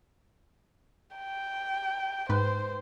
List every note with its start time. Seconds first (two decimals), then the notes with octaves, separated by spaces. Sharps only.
1.16 G5
2.29 G#2 B4 C5